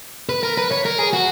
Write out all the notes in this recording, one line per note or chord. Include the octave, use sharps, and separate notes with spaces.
B4
A#4
B4
C#5
A#4
G#4
F#4